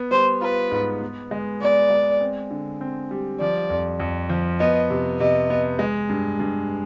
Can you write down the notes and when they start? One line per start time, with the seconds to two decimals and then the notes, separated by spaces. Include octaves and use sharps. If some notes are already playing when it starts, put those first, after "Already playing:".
Already playing: B3
0.11 G3 C5
0.41 F4 B4
0.71 G#2
1.01 B3
1.31 G#3
1.61 B3 D5
1.90 G#3
2.20 C4
2.51 D3
2.81 C4
3.11 G3
3.40 F3 D5
3.70 F2
4.00 F2
4.29 F3
4.60 B3 D#5
4.90 C3
5.20 C3 D#5
5.50 B3
5.79 G#3
6.09 G2
6.39 G2